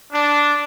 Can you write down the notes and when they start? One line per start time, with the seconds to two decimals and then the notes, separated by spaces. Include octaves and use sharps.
0.12 D4